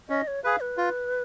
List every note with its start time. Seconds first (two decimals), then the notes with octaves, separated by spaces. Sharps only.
0.09 C#4 D#5
0.27 C#5
0.44 G#4 B4 F5
0.60 B4
0.77 F4